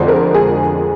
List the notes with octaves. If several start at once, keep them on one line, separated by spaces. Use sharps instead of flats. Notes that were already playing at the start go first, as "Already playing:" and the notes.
Already playing: F2 D3 G#3 C5
A#4
G#4